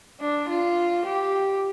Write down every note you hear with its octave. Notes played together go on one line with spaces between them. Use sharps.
D4
F4
G4